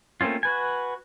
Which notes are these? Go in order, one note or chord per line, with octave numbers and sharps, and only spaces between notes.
A3 A#3 C4 C#4 F4
F#4 B4 G#5